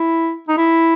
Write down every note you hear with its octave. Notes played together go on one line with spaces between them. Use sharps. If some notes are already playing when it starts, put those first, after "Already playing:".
Already playing: E4
D#4
E4